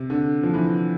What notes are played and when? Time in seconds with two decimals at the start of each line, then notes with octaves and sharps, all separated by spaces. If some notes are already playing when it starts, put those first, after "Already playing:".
Already playing: C3
0.10 D3
0.43 F3
0.54 E3